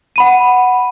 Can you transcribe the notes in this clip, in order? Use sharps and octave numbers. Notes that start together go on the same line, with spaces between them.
F#5 B5 D#7